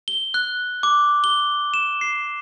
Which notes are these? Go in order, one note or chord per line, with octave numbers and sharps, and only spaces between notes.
G7
F#6
D6
G7
E7
C7